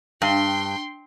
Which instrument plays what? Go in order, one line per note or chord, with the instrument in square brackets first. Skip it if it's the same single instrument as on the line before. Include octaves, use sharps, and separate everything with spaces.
[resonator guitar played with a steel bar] G2 [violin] G5 C6